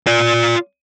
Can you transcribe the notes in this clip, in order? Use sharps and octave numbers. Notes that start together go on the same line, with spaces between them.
F4 D5